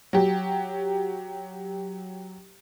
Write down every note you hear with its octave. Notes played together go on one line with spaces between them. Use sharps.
F#3 G4